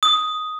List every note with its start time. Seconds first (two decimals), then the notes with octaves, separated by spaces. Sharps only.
0.03 D#6